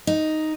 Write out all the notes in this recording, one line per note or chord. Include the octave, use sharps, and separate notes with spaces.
D#4